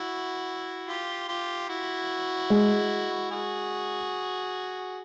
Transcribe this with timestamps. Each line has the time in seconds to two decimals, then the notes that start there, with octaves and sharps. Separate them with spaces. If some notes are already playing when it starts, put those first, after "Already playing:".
Already playing: E4 F#4
0.88 F4 G4
1.28 F4 G4
1.69 E4 F#4
2.50 G#3
3.31 F#4 G#4